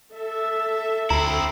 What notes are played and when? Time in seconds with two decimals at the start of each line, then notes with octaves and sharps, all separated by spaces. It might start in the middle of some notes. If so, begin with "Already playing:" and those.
0.15 A4 E5
1.10 D2 C4 E4 A#5